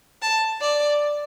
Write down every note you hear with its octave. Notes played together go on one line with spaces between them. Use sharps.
A5
D5